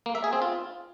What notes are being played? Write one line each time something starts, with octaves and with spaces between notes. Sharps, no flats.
A#3
E5
G#4
C4
F4